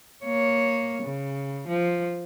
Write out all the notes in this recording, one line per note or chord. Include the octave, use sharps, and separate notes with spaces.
A#3 C#5
C#3
F3